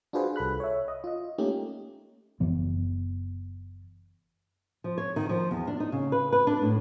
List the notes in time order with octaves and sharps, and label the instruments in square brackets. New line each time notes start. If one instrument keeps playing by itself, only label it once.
[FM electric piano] D4 F4 F#4 G#4 B4 C5
C2 A4 B5 F#6
C#5 E5
D#5
F4 D#5
A3 A#3 C#4 D#4 G4
[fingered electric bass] F#1 F#2 E3 B3
[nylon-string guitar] F3
C#5
D#3
F3
E2
D4
D#4
C#3
B4
B4
D4
A2